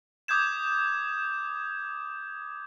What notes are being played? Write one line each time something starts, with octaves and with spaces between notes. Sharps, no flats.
D6 D#6 G6 G#6 E7